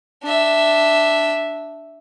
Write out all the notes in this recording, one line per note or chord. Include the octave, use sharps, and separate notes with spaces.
D4 E5